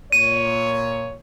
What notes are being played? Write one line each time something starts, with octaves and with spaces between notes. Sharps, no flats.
A#2 C#5 D#7